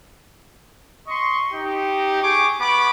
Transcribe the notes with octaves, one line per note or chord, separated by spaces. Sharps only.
D#5 C6 C#6
D#4 G4
G4 G#4 C#6 D6
B3 B5 C#6 D6